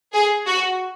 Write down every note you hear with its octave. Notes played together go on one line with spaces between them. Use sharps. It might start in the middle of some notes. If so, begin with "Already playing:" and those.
G#4
F#4